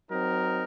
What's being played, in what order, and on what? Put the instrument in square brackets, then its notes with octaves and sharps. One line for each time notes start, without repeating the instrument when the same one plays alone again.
[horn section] F#3 C4 D#4 A#4